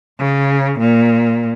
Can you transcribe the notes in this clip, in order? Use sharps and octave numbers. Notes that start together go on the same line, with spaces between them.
C#3
A#2